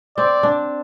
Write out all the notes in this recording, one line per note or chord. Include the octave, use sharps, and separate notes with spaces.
C4 D5
D4